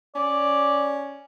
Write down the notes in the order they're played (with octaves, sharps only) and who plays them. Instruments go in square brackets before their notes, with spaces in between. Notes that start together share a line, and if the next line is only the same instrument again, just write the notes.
[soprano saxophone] C#4 [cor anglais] D5